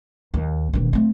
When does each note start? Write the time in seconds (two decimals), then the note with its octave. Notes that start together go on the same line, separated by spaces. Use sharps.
0.34 D#2
0.73 E1 D#3
0.93 A3 C4